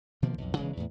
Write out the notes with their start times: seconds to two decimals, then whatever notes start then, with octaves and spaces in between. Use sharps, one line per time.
0.22 B2 D#3 F3 A#3
0.38 B1 F2
0.57 E1 C#3 E3 G#3
0.77 E2 A2